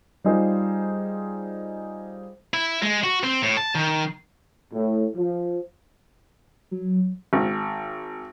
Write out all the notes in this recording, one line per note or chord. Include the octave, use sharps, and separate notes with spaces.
G3 D#4 F4 G#4 C5
E4
G#3
F#4
C4
A2
A5
D#3
A2
F3
F#3
G#1